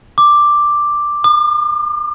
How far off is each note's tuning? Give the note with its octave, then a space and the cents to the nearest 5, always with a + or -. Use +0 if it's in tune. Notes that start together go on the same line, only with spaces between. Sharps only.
D6 +5
D6 +45